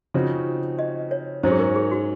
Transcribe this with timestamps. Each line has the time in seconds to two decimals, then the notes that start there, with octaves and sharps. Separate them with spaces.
0.14 C#3 F3 C4 D#4 F#4
0.79 D#5
1.11 C#5
1.43 G#2 F#3 C#4 C5
1.52 G#4
1.59 A#4
1.76 G#4
1.91 F#4